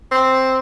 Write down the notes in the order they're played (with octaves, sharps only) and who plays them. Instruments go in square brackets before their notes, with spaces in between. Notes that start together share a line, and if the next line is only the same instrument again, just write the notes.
[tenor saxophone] C4